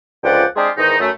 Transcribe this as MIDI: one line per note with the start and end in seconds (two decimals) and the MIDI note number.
0.24 0.45 37
0.24 0.45 50
0.24 0.45 53
0.24 0.45 74
0.24 0.45 78
0.24 0.45 79
0.56 0.69 56
0.56 0.69 60
0.56 0.69 62
0.56 0.69 65
0.56 0.69 67
0.56 0.69 68
0.77 0.96 40
0.77 0.96 44
0.77 0.96 51
0.77 0.96 63
1.00 1.10 42
1.00 1.10 57